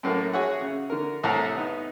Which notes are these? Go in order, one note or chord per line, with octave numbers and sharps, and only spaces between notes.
F#2 A2 F#3 A#3
F#4 G#4 C#5 E5 F#5
C#3
D3 A#4
C2 A2 F#5 A#5
B3 D#4